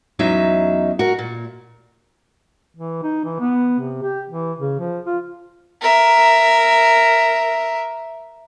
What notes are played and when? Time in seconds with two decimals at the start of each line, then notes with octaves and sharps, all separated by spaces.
0.19 E2 F#3 C#4 D#4 E5
0.99 F#4 A#4
1.19 A#2
2.77 E3
3.03 D#4
3.24 E3
3.40 B3
3.79 C3
4.02 G4
4.30 E3
4.59 C#3
4.79 F3
5.05 F4
5.81 A#4 E5